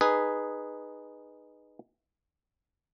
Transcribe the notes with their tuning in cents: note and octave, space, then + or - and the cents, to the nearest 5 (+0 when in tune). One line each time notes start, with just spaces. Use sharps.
D#4 -20 G#4 +0 B4 +0